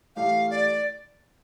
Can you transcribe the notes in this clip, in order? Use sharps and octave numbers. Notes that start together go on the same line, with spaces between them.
A2 E3 A3 E4 G4 F5
D5